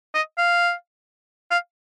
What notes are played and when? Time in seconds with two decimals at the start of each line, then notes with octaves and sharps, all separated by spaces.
0.15 D#5
0.38 F5
1.51 F5